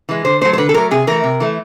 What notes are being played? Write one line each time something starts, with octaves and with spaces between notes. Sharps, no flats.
E3 G#3
D3 C5
F#3 A3 C5
C5
D3 B4
A4
F#3 A3 A#4
C3 G#4
E3 A3 A#4
C3
E3 A3